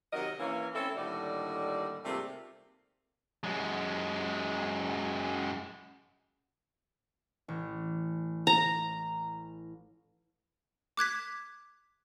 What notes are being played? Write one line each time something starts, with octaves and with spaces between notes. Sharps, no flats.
C3 D#3 F#3 A#4 D#5
E3 A#3 C#4
A3 C4 C#4 E4 A4
D#2 A2 D3 G3 D5 D#5
G#2 C3 G3 A3 A#3 F4
F#2 G#3
A1
A#5
D6 F#6 G#6 B6